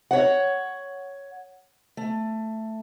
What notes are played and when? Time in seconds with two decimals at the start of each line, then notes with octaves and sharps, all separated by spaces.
0.11 C#5 F#5
1.97 A3